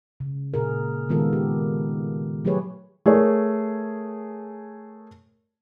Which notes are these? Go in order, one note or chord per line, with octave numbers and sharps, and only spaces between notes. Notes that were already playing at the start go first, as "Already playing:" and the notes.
C#3
A#2 G#4 A#4
D#3 G#3 B3 F4 A4 A#4
G4
F#3 A3 G4 G#4 B4 C#5
A3 G#4 A#4 C#5